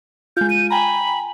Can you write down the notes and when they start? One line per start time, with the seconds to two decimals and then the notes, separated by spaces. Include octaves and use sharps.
0.37 G#3 F4 G6
0.50 D#7
0.71 G5 G#5 A#5 B5